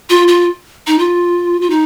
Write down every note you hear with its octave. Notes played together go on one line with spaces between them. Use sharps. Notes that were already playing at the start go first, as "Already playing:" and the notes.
F4
F4
D#4
F4
F4
D#4